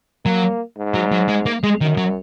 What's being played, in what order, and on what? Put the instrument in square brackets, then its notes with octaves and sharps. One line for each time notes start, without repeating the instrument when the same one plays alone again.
[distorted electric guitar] F#3 [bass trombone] A#3
[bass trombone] G#2
[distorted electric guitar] F#3
F#3
G#3
A#3
G#3
[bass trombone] F#2 [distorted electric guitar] D#3
[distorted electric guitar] F#3